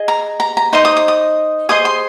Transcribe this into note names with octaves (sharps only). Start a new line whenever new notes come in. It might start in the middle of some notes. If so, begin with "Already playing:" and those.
Already playing: G#4 D#5
A#5
A#5
A#5
D#4 C5 D#5 C6
D#6
D#6
D#6
G#4 C5 D#5 D#6
C6